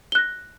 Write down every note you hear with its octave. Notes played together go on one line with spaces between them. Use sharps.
F#6 A#6 G7